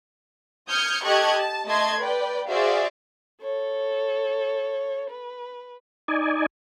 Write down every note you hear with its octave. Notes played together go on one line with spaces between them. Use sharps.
D#6 F6 G6 G#6 C#7
G4 A4 D#5 C#6 F#6 G#6
A5
A3 D#5 A5 C6 G#6
B4 D5 G5
F#4 G#4 C5 D5 E5 F5
A4 C#5
B4
D#4 D5 G#5